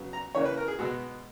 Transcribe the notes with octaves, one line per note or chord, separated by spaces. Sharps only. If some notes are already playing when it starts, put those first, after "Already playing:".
Already playing: C#3 F#3 B3
A#5
C#3 E3 A#3 C#5
B4
A#4
G#4
B2 G#3 B3 F#4